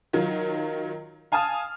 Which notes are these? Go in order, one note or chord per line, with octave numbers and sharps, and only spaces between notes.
D#3 F#3 F4
F5 G#5 A5 D#6 F6